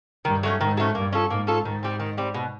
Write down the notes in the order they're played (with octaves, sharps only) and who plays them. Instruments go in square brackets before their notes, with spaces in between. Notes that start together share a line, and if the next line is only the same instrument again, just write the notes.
[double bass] G2 [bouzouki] D#3
[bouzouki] F#3 A3 C#4
[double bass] G#2 [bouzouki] D#3
[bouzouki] F#3 A3 C#4
[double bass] G2 [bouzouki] A#3
[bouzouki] C#4 F4 A4
[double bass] G#2 [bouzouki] A#3
[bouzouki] C#4 F4 A4
[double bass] G#2 [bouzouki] D#3
[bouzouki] G3 C4
D#3
G3 C4
B2